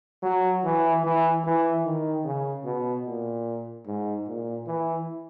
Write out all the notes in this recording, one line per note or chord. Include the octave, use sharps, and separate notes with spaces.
F#3
E3
E3
E3
D#3
C#3
B2
A#2
G#2
A#2
E3